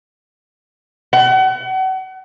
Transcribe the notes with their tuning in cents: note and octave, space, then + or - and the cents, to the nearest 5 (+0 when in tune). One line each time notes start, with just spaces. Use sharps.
F#5 +35